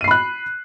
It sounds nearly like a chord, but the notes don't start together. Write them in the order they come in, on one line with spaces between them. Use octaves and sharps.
D#7 C7 B5 F#6